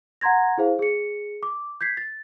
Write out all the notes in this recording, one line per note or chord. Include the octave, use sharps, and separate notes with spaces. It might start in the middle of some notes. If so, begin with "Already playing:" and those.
F#5 A#5 C6 G#6 A#6
E4 G#4 C5 F5
G#4 C#7
D6
G6 G#6 B6 C7
A6